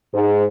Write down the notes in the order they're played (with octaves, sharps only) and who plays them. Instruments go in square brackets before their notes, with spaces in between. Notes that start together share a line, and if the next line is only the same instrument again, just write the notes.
[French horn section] G#2